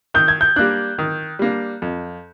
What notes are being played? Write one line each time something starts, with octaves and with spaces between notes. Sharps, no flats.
D#3 G6
G#6
G6
G3 A#3 D4 F#6
D#3
G3 A#3 D4
F2